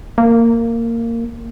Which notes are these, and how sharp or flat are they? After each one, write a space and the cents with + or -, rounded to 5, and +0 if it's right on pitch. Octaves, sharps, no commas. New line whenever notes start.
A#3 -15